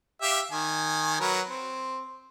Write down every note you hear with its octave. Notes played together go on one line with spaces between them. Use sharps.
G4 E5 F5
D#3 G#5
F#3 A#4 B4
C4